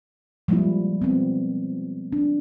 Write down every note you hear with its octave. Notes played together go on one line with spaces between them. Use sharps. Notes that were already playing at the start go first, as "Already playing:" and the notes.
F3 G3 G#3 A#3 E4
B3 C4
D4